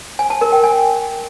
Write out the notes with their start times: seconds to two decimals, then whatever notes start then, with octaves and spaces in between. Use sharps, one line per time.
0.19 G#5
0.30 A5
0.41 A#4
0.52 G5
0.64 G#5